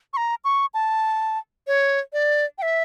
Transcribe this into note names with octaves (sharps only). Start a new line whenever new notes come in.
C#6
A#5
C#6
A5
C#5
D5
G5
E5